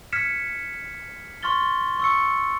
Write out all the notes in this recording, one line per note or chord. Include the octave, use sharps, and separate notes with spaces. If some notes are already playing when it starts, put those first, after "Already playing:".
F6 G#6 B6 C#7 E7
C6 C#6 F6 A6 G7
C#6 E6 C#7